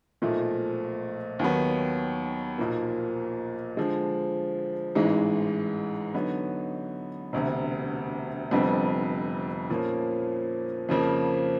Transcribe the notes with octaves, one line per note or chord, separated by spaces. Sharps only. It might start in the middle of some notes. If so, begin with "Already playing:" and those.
B1 A#2 F3 A3
D#2 D#3 F#3 B3
B1 A#2 F3 A#3
D3 F3 G#3
A1 G#2 E3 G#3
D3 F#3 B3 D#4
E1 D2 C3
F1 F2 D3 G3 B3
A#2 F3 A#3 C#4
F2 C#3 F3 A#3